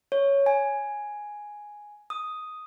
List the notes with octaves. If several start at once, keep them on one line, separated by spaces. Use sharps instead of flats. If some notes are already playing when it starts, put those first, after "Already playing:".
C#5
G#5
D#6